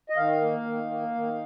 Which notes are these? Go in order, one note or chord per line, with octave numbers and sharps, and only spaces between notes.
D#5
D#3 F5
A#3
D#3
A#3
D#3